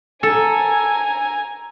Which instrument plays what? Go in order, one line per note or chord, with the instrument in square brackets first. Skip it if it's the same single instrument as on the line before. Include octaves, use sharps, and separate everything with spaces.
[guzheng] A4 [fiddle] G#5 A#5